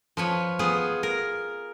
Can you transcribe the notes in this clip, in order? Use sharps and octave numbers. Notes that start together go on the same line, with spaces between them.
F3 B4 C#5
B3 F4 G#4
A#4